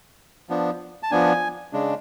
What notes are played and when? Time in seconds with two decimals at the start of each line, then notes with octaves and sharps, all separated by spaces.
0.49 F3 B3 D4
1.03 A5
1.11 F3 B3 D4 G#5
1.73 C#3 G#3 D4